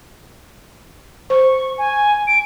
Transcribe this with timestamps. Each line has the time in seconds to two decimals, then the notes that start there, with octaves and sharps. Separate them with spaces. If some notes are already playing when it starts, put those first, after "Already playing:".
1.30 C5 C#6
1.78 G#5
2.27 D7